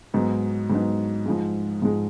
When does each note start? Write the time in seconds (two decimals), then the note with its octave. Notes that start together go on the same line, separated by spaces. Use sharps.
0.14 G#2 F#3 B3 D#4
0.70 G#2 F#3 B3 D#4
1.25 G#2 F3 G#3
1.82 G#2 F3 G#3